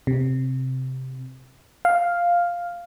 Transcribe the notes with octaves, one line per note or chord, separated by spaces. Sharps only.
C3
F5